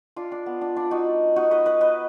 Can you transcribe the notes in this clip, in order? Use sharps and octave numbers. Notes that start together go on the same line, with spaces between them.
D4 F4
D4
B3
D4
D4 F4
D#4 F#4
D#4 F#4
B4 D#5
B4 D#5
B4 D#5